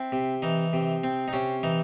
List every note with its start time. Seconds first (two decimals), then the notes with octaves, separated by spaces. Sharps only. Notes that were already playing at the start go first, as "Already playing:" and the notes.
Already playing: C4 E4
0.12 C3
0.42 E3 D#4
0.73 C3
1.04 C4
1.28 D#4
1.33 C3 C#4
1.63 E3 D#4